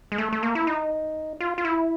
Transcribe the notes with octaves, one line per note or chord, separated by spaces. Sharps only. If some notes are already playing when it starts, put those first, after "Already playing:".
G#3
A3
A3
A#3
E4
D#4
F4
F4
E4